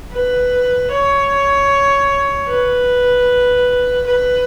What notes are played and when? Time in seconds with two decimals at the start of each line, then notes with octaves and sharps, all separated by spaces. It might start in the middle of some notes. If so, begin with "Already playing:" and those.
0.12 B4
0.91 C#5
2.48 B4
4.06 B4